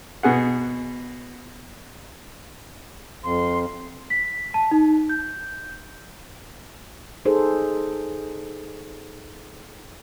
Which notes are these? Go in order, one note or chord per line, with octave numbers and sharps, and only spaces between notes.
B2 G#4 F#5
F2 C6
B6
A5
D#4
G6
D#4 G#4 A4 C5